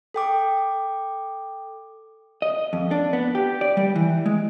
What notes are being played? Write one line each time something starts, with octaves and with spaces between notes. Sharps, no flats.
A4 G5 D6
D#5
F2
D4
B3
G4
D5
G3
E3
G#3